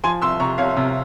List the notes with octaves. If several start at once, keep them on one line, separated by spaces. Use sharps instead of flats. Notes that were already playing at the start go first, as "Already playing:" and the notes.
F3 G#5 C6
C2 C6 E6
C3 A#5 C#6
C2 C#5 F5
C3